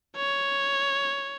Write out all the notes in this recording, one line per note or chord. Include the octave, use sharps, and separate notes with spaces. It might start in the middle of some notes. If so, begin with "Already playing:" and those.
C#5